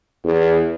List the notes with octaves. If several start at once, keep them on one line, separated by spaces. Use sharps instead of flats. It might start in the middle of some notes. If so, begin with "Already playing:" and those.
E2